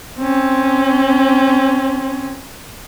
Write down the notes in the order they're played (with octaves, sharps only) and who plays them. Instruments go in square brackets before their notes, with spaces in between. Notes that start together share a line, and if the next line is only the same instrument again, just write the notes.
[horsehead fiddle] C4 C#4